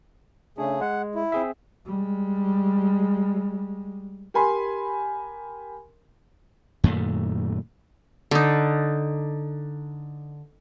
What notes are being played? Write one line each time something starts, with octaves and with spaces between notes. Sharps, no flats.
C#3 A3 D4 G#4
G#3 F#5
E4
C4 G#4 E5
G3 G#3
G4 A#4 G#5 B5 C6
F#2 A#2 D#3 A3
D3 D#4